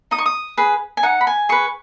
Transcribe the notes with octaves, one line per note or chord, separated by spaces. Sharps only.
D#4 D#6
C#6
D#6
G#4 B4
G#5
D#4 F#5
B5
G#5
G#4 B4 C#6